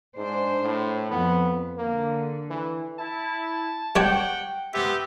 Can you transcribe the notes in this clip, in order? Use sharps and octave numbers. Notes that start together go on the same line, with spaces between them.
G#2 D4 C5
A2
F2 B3
D3 A#3
E3
E4 A5
G3 C#5 D5 F#5 G5
B3 C4 G4 E5